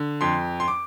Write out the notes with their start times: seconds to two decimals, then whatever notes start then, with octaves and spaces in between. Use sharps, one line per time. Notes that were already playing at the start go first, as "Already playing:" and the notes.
Already playing: D3
0.21 F2 C6
0.60 C6
0.68 D6